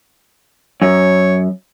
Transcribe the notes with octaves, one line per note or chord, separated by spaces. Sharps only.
F#2 C#5